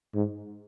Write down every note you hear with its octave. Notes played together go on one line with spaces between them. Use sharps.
G#2